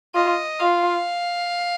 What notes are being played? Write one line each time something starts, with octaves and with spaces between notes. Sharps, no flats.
F4 D#5
F4 F5